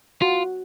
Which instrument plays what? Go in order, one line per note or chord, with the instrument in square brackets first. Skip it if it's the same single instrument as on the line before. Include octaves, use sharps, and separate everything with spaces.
[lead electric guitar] F4 [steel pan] F#4